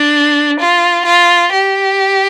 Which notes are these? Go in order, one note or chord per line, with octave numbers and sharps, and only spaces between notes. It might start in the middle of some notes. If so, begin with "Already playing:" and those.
Already playing: D4
F4
F4
G4